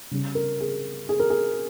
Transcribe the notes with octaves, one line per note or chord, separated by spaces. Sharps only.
C#3 G3 C#4
A#4
G#4
G#4
A#4
G#4